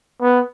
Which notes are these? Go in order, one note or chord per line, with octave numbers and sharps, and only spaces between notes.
B3